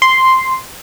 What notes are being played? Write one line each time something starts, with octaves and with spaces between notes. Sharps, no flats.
C6